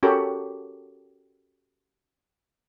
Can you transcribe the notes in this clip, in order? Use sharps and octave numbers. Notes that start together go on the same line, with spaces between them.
C#4 F#4 G4 A4 A#4 B5